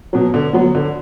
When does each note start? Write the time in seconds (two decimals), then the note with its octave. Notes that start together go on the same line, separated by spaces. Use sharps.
0.13 B2 F#3
0.34 D3
0.53 F#3 B3
0.75 D3